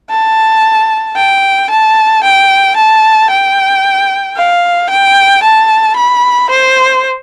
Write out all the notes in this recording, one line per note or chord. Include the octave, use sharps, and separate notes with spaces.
A5
G5
A5
G5
A5
G5
F5
G5
A5
B5
C5